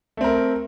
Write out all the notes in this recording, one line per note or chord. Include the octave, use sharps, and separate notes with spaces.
A3 C4 A#4